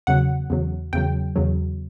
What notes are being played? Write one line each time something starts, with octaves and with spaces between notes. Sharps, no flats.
E2 C#3 F#3 F#5
E2 C#3 F#3
E2 C#3 F#3 G5
E2 C#3 F#3